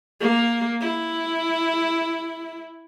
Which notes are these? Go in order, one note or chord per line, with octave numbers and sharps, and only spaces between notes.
A#3
E4